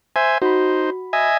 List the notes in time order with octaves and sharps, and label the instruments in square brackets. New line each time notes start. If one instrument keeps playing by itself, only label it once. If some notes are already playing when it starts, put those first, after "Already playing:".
[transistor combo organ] C5 E5 G#5
[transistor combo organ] D#4 C5 [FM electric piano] F#4 B5
[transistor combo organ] D#5 E5 G#5